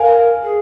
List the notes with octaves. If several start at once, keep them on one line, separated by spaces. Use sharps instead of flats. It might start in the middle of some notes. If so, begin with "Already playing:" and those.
Already playing: A#4 F5 G#5
G#4